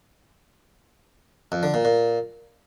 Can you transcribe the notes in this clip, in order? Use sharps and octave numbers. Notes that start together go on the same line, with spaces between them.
F2
D3
A#2
A#2